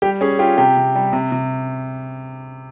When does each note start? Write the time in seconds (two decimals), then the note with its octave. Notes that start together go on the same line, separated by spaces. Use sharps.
0.02 G3 G4
0.21 C#4 G#4
0.39 F4 G4
0.58 C3 G4
0.77 C3
0.95 G3
1.13 C3
1.32 C3